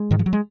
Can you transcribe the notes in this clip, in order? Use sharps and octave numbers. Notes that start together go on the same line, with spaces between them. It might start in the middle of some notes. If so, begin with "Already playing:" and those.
Already playing: G#3
G#2 D#3
F3
F#3
G#3